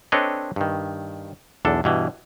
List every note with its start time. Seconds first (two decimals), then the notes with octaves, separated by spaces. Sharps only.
0.12 C4 D4 A4 B4 C#5 D#5
0.56 G2 D#3
1.65 B1 E2 D4 A4
1.84 G2 B2 E3